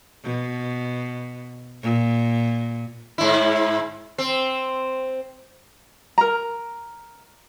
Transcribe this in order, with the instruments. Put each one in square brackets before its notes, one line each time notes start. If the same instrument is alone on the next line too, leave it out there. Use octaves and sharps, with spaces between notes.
[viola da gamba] B2
A#2
[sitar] G#2 E4
C4
[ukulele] A#4 A#5